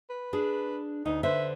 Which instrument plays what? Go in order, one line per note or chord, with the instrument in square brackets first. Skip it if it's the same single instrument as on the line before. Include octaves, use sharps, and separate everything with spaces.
[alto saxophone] B4
[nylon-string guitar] D4 G#4
[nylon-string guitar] D2 [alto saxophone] D#4
[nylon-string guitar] D3 B4 C5 [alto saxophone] E5